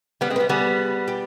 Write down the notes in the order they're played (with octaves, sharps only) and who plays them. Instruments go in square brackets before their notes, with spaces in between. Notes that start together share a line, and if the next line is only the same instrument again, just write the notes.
[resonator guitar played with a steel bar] G3 B3 [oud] B4
[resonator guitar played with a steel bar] G#3 C4
[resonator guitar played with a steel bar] G3 B3 [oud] B4
[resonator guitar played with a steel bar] G3 B3 [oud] G#4
[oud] G4